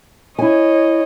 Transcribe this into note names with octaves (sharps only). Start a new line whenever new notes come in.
E4 C#5 D#5 G#5